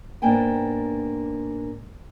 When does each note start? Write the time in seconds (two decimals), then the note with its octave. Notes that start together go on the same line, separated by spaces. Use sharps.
0.22 G#2 A#3 B3 D4 G5 G#5